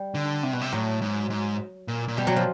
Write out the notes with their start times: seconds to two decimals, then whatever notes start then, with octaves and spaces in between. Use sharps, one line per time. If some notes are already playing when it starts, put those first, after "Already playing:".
Already playing: G3
0.14 D3
0.43 C3
0.53 B2
0.61 C3
0.73 A2 F#3
1.02 G#2
1.30 G#2
1.88 A#2
2.08 A#2
2.17 B2 G3
2.27 F#3
2.36 F3